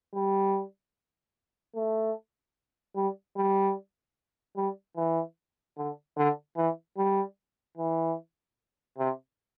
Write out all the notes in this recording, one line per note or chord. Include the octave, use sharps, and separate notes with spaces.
G3
A3
G3
G3
G3
E3
D3
D3
E3
G3
E3
C3